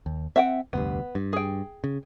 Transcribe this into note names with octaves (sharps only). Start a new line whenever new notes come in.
D#2
C4 E5 F#5 G5
F1 D2 G2 B3
G2
G#4 G5
C#3